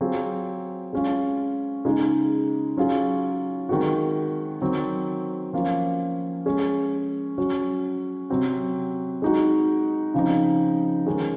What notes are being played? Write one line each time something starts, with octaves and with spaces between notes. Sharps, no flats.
F#3 C4 F4 G#4
G#3 C#4 F4
C#3 G#3 D#4 G#4
F#3 C#4 F4 G#4
D#3 G#3 C4 F#4
D#3 F#3 C4
F3 A#3 C#4 F4
G#3 C#4 G#4
F#3 C#4 F#4
C3 F#3 C4 F#4
G#3 D#4 F#4
C#3 F3 C4 D#4
D#3 G#3 C#4